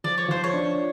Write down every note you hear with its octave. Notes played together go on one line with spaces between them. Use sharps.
F3 D5
C#5
F3 C5
C#5
D4